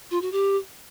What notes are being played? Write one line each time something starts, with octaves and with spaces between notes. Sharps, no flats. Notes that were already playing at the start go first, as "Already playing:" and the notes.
F4
F#4
G4